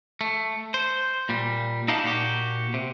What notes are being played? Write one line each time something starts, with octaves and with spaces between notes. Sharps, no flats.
A3
C5
A#2 G3
D#4 E4 F#4 G4 F5 A5
A#2 F#4 G4
C3